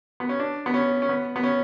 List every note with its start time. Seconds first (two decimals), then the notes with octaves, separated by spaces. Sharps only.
0.20 B3
0.29 C#4
0.39 D4
0.66 B3
0.74 C#4
1.02 C#4
1.09 B3
1.36 B3
1.43 C#4